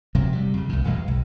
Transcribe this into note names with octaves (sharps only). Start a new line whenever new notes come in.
D1 C3 F3 F#3
C3 G3
F2 C#3
C2 A2
B1 E2 B2 G#3
B1